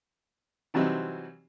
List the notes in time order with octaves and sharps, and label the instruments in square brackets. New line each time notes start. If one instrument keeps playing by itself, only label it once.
[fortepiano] C3 E3 F#3 G3 C4 D#4